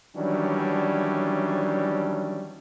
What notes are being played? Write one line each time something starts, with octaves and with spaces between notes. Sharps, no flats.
D#3 E3 F#3 G3 C#4 D4